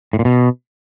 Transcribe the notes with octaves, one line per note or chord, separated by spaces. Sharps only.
A2
A#2
B2